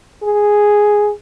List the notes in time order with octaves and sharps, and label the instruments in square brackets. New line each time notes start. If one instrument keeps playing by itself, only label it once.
[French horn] G#4